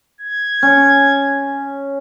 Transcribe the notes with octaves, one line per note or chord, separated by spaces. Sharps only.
G#6
C#4